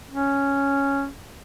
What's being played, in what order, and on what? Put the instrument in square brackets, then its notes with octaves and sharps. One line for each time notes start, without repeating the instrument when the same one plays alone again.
[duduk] C#4